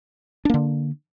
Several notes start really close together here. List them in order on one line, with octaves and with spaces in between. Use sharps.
D4 A#3 D3